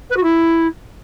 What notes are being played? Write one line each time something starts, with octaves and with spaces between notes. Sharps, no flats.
B4
F#4
E4